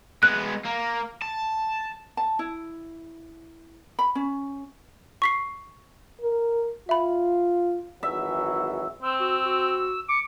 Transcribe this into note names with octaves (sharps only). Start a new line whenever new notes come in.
G#3 B3 F#6
A#3
A5
A5
E4
B5
C#4
C#6 B6 C7
A#4
F4 E5 B5
G#1 E3 F#3 E5
C4 E6
F#4 E6
F#4
D6 C#7